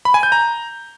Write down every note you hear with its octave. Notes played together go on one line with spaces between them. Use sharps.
B5
G#5
G6
A#5